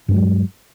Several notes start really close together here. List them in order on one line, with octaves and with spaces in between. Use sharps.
G2 B3 G#3 F#3